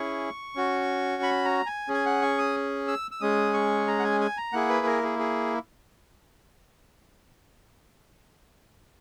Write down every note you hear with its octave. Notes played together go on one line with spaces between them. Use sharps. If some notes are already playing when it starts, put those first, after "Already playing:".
Already playing: C#4 E4 G#4 C#6
C#4 F#4
B5
A#5
G#5
C#4 G#4
G#5
F#5
C#6
D#6
E6
E6
G#3 C#4 G#4 D#6
C#6
A#5
F#5
G#5
G#5
A#5
A#3 E4 G#4 F#5
B4
A#4
G#4
G#4